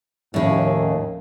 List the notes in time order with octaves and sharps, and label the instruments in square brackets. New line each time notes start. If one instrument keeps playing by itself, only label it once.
[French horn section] D#2 [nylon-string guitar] A2 C#3 [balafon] F3 C#4